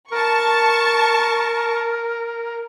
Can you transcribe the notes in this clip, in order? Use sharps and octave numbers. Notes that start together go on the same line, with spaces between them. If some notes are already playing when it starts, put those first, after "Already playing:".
A#4 A5 C#6